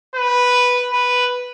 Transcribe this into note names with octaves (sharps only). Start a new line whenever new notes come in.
B4
B4